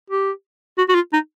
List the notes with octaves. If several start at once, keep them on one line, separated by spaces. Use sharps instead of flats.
G4
F#4
F#4
F4
D#4